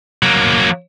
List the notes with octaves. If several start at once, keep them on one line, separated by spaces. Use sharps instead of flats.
F#3 A#3